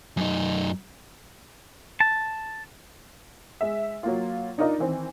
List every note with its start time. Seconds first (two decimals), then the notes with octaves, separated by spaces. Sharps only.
0.17 F#2 D#4
2.00 A5
3.61 G#3 E5
4.03 F#3 A#3 F4
4.58 D4 D#4 F4 A#4 D5 D#5
4.78 D#3 E3 C4